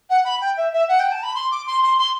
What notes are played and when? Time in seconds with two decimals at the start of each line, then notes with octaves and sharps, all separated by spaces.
0.09 F#5
0.24 B5
0.40 G5
0.56 E5
0.72 E5
0.88 F#5
0.99 G5
1.11 A5
1.22 B5
1.34 C6
1.50 D6
1.66 C6
1.82 C6
1.98 C6